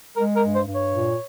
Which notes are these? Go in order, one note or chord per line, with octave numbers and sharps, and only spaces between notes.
G#3 A#4
A#4
G2
C5
G2
C#5
A#2